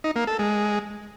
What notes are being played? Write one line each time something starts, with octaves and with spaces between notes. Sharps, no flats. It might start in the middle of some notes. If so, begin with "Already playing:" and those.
D#4
A#3
A4
G#3